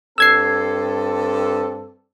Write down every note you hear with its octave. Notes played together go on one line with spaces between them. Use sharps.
G2 C4 A4 E6 G#6 C7